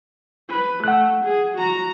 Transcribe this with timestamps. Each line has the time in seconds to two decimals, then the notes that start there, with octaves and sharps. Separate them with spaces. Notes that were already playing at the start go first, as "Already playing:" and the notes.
0.49 B4
0.84 A3 F#5 F#6
1.25 G#4
1.58 F#4 A#5